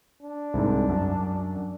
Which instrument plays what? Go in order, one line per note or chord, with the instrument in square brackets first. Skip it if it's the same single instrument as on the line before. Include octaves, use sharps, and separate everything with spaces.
[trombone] D4
[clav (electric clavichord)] C2 G#2
F#2